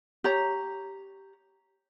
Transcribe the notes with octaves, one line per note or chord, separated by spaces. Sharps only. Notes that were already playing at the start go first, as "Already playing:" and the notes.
G4 C#5 A#5